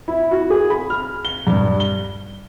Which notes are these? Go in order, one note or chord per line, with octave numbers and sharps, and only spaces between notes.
E4
F#4
G#4
B5
F6
G7
G2
G7